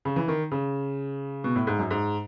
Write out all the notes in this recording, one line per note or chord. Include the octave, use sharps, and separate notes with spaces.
C#3
E3
D#3
C#3
B2
A2
G#2
F#2
G#2